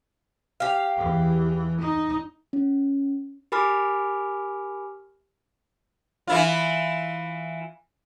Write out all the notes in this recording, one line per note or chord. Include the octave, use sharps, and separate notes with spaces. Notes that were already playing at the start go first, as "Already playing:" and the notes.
G4 F5
E2 E3
D#4
C#4
G4 A#4 G#5 B5 D6 F6
E3 E4 F4